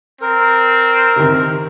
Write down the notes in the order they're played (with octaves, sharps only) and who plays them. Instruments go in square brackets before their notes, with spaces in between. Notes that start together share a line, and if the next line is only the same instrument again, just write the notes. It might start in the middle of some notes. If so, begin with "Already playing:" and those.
[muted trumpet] C4 [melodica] A#4
[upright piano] C3 D#3